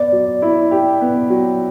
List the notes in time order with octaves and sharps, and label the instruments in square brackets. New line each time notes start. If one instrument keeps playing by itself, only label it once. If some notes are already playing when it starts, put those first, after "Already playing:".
Already playing: [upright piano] B3 [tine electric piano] D5
[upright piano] F#3
E4
G4
B3
F#3